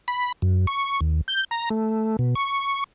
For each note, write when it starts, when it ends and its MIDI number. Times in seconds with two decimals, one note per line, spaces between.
0.08 0.32 83
0.42 0.66 42
0.67 1.00 85
1.01 1.21 39
1.28 1.44 91
1.51 1.69 82
1.70 2.16 57
2.19 2.35 47
2.35 2.84 85